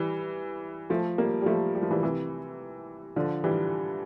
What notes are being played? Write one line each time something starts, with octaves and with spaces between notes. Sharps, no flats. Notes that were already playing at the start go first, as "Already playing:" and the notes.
Already playing: E3 G3
F3 A3
G3 A#3
G3
F3 A3
G3
F3
E3 G3
C3 E3
D3 F3
E3 G3